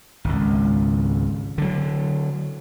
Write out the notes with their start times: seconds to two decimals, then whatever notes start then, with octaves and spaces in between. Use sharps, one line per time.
0.24 G#1 C#2
1.58 D3 F#3